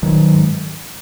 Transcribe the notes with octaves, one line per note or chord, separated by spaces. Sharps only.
A#1 D#3 F#3
G#2